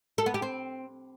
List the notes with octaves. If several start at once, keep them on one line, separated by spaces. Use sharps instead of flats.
A4
B3
G4
C4